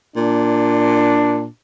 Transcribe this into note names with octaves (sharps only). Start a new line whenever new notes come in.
A#2 D4